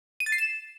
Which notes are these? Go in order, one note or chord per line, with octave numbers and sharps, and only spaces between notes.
D#7
A6
C7
E7